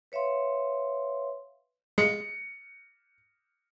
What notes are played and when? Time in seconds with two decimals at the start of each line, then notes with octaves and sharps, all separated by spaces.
0.12 B4 C#5 E5 F5 C6
1.98 G#3 C#7